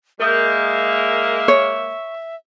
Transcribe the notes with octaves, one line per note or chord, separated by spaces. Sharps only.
G#3 A#3 A#4 E5 D#6 G6
C#5